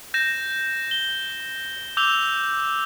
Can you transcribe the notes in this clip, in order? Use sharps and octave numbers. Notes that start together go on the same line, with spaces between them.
G6 A#6 E7
G7
D6 E6 G6 F7 G7